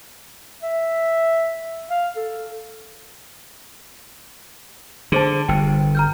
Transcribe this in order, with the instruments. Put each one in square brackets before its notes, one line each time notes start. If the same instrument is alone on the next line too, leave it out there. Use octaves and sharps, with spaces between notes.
[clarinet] E5
F5
A4
[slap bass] D3 [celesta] G#4 C5 A5
[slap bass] G1 [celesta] G5
[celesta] A#5 F6 G6